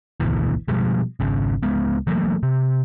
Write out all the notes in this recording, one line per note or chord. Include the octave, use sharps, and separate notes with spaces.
G#1 D2 B2 E3
B2 F3 G3 G#3
G#1 C#3
C#2 G#3 B3
E3 F#3 A3 A#3
C3